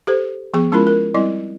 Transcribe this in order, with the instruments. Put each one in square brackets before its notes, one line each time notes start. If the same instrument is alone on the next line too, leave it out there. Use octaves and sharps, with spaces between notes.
[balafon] G4 A4 C5
F3 B3 G#4 C#6
G#3 C#4 E4 F4 A#4 B5
A#4
G3 C4 E4 D#5